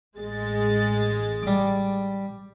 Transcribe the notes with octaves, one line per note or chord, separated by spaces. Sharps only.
A1 G#3 A6
G3 D6